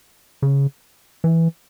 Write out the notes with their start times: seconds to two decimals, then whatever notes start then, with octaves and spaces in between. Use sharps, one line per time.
0.42 C#3
1.24 E3